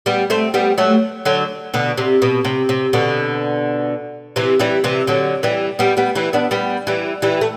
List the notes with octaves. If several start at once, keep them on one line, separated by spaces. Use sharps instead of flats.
G3 B3
A3 C4
G3 B3
F#3 A3
D3 F#3
B2 D3
C3
B2
C3
C3
B2 D3
C3 E3
E3 G3
C3 E3
D3 F#3
E3 G3
G3 B3
G3 B3
E3 G3
B3 D4
G3 B3
E3 G3
E3 G3
A3